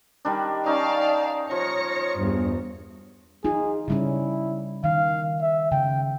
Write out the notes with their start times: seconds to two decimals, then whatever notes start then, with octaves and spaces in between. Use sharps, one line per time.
0.25 D#3 G3 D4
0.66 D#3 C#4 D#4 D5 F5 A5
1.51 F3 C#5 A#6 C#7
2.17 E2 G2
3.45 D#4 F4 G#4
3.88 C#3 G3 C#4 E4
4.84 D#3 F5
5.41 E5
5.72 C#3 G5